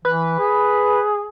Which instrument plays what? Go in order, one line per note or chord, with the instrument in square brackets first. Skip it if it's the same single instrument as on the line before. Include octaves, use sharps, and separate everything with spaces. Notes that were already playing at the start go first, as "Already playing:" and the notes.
[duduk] E3 [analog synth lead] B4
[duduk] G#4